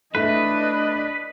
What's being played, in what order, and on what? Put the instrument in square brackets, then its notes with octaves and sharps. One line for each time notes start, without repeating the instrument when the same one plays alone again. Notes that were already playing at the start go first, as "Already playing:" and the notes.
[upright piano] A3 E4 [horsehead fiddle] D4 D#5 [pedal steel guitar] B4